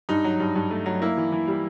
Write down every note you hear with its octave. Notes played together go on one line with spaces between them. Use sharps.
G2 D#4
F#3
G2
G2
A3
F#3
A#3 E4
E3
E3
G3